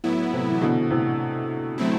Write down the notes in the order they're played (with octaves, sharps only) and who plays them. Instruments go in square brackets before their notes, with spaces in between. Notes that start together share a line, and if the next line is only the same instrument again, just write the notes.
[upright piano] A2 [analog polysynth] F#3 B3 E4
[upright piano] A2 C3
E3
B2 D3
A2 C3
[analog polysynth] F#3 A3 C4 E4